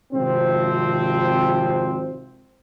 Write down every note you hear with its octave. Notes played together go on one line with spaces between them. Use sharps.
G#1 C3 F3 C4